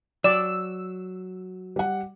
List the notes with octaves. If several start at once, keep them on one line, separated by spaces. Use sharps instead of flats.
F#3 D5 E6
G3 F#5